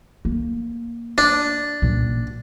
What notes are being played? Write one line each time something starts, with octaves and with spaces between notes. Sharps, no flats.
A#3
D4
A1 A#2